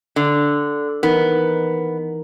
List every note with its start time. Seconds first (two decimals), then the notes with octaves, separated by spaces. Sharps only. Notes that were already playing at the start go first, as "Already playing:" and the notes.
0.16 D3
1.03 E3 B3 D#4 A#4